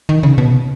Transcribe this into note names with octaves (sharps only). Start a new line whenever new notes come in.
D#3
C#3
B2